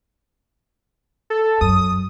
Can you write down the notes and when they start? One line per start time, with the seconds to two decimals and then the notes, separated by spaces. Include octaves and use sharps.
1.30 A4
1.61 F#2 D#6